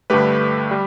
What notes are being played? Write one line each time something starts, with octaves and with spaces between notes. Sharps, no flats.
G2 D3 A3 G4 B4
G3